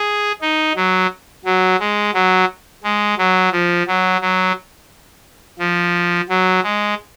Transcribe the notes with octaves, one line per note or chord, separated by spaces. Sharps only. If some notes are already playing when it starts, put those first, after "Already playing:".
Already playing: G#4
D#4
F#3
F#3
G#3
F#3
G#3
F#3
F3
F#3
F#3
F3
F#3
G#3